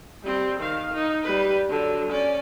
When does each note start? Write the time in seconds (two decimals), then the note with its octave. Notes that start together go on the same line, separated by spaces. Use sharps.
0.23 G3 C4
0.59 D#3 F5
0.94 D#4
1.23 G3 B4
1.69 D3 F#3
2.11 C#4 D5